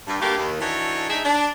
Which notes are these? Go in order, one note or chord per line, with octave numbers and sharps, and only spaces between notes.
G2
D2 G2 A3 A#3 G4
D#2
E3 D4 D#4 F#4 A4 C#5
G#3 D4 D#4 G#4 E5
D4